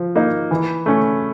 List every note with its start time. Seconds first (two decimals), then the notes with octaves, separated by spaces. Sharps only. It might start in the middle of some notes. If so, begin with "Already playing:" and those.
Already playing: F3
0.15 A#3 D#4
0.51 E3
0.86 A3 C#4